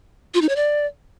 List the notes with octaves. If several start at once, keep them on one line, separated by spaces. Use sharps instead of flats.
F4
D#4
C#5
D5